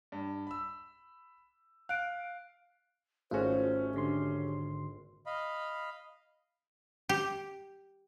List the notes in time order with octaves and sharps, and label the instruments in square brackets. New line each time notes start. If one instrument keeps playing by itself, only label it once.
[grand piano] G2
B5 E6
[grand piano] F5 [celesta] F#6 D7
[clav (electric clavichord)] G#1 F#4 [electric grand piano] A3 C#4 [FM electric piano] F4 G#4 [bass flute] C5
[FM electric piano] G#2 D3 C6 [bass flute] G4
[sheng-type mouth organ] D#5 F5 B5
[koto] G4